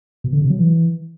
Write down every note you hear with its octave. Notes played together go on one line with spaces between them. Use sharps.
B2
D3
C3
F#3
E3